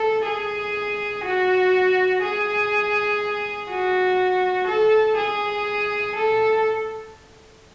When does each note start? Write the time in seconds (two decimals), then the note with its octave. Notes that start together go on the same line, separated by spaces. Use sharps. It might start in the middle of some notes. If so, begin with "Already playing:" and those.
Already playing: A4
0.26 G#4
1.24 F#4
2.22 G#4
3.70 F#4
4.68 A4
5.17 G#4
6.15 A4